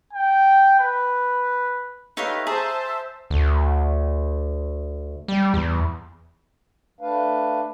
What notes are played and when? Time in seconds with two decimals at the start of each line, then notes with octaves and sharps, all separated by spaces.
0.13 G5
0.80 B4
2.17 A3 D#4 G4 B4 C#5 F5
2.47 G#4 C5 E5 A5 A#5
3.30 D2
5.28 G3
5.54 E2
7.01 A3 D4 B4 F5